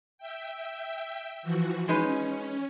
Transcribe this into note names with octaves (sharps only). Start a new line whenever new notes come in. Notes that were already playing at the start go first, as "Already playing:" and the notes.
E5 G5
E3 F3 F#4
G#3 C#4 D#4 B4